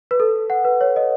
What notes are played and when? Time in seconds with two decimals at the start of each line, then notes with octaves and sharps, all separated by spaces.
0.11 B4
0.20 A4
0.50 F#5
0.65 B4
0.81 C#5
0.96 D#5